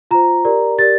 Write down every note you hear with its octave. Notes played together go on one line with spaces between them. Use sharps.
F4 C5 A#5
G4 A#4 D5
G4 A#4 D5 A6